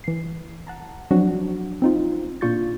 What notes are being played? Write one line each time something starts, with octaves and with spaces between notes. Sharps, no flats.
E3 C7
F#5 A5 A#5
F3 F#3 C4 D4 F#4
C4 D#4 F4
A#2 D4 F4 C#6 G6 A6